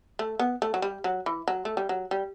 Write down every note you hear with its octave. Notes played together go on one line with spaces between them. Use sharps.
A3
B3
A3
F#3
G3
F#3
E3
F#3
A3
G3
F#3
G3